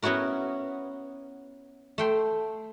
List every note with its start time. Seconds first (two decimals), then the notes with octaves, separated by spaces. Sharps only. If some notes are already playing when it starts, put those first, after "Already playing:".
0.02 B3 C#4 E4 F#4 A#4
1.98 A3 G5 C6